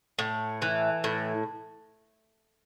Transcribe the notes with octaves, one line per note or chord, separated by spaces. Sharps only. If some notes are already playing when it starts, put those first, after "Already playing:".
A2
E3
A2